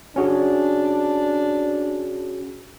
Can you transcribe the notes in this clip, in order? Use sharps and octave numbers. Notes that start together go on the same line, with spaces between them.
C#4 D4 F#4 G#4